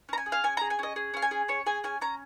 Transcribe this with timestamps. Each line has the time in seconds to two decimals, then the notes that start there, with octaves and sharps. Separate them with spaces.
0.09 C#4 A#5
0.18 G#5
0.26 G#4
0.32 F5
0.44 C#4 G#5
0.57 G#4 A#5
0.70 G#5
0.79 C#4 D#5
0.96 G#4
1.14 C#4 F5
1.22 G#5
1.31 G#4
1.48 C#4 C#5
1.66 G#4 G#5
1.84 C#4 G#5
2.01 C#4 A#5